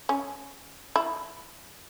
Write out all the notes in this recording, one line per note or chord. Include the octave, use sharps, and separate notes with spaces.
C#4
E4